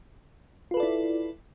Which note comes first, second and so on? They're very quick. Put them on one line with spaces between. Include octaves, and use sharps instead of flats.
F4 B4 A4 D5 E4